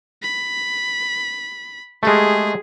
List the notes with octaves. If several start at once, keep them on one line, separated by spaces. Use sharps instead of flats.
B5
G#3 A3 G4 G#4